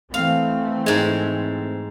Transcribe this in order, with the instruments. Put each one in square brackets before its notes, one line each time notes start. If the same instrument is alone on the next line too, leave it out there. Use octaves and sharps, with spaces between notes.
[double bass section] E3 A3 C4 [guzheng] F5
[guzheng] G#2 G#3